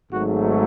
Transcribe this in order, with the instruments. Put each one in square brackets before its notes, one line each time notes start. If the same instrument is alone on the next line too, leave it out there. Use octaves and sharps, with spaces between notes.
[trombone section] G#1 G#2 F#3 A3 F#4